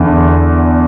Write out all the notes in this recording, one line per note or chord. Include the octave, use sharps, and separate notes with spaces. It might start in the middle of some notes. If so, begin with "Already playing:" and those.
Already playing: E2 D3